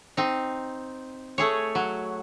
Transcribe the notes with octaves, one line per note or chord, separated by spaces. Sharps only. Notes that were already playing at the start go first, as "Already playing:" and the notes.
C4 D#4
A3 G#4 C#5
F#3